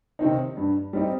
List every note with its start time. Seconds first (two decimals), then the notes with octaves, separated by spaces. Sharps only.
0.19 C3 D#3 C4 D#4
0.57 G2
0.93 G3 C4 D#4